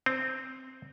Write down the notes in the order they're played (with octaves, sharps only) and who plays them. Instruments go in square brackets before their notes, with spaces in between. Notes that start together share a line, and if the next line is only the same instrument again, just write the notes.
[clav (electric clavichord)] C4